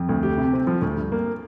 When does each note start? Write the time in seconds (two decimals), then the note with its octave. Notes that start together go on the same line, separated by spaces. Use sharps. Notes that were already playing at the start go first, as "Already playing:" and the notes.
Already playing: F2
0.09 D2
0.23 G4
0.38 C3
0.53 C4
0.67 F3
0.82 D2
0.96 G2
1.12 A#3